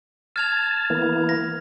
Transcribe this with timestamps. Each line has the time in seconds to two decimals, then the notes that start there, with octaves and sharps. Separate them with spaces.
0.36 A5 F6 G#6 F7
0.90 E3 A#3 B3
1.29 A#6